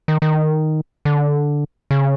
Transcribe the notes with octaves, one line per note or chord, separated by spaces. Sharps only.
D#3
D#3
D3
C#3